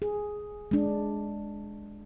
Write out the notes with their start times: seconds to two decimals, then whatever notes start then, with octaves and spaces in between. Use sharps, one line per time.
0.02 G#4
0.71 G#3 D4